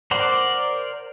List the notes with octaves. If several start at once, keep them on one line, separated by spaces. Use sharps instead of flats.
A#4 C5 D5 F#5